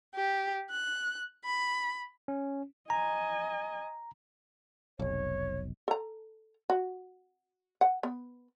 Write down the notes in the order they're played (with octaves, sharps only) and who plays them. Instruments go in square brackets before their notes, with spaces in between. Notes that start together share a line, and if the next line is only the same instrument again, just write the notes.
[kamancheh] G4
F#6
B5
[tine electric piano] C#4
[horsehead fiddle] D#5 G#5 [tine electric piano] A#5
[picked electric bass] F1 B1 [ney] C#5
[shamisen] A4 A#5
F#4
F#5
B3